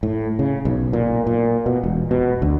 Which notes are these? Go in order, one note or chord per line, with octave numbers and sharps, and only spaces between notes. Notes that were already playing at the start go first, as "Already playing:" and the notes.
A2
C#3
B1
A#2
A#2
B2
E1
B2
D2